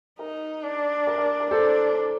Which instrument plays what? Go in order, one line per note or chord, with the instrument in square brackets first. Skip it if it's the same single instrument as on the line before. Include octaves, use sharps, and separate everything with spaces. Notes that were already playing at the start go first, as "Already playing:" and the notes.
[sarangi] D#4 [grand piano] A#4
[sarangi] D4
[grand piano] A#4
A#4
A#4
[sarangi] D4 [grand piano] A4 C5